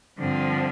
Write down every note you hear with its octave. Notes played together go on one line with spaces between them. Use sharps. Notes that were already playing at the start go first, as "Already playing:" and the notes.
G2 D3 F3 C4